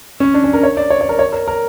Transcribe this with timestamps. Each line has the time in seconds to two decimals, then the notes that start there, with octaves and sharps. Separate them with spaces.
0.20 C#4
0.34 D4
0.44 C#4
0.53 A#4
0.63 C#5
0.77 D5
0.90 C#5
1.01 C#5
1.09 A#4
1.19 C#5
1.33 A#4
1.48 A#4